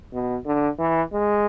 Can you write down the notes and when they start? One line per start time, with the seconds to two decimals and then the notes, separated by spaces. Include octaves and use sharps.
0.13 B2
0.46 D3
0.79 E3
1.13 G#3